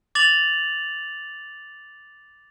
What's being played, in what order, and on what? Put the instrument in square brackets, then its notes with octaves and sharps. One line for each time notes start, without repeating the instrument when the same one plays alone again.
[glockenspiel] D6 A6 F7 F#7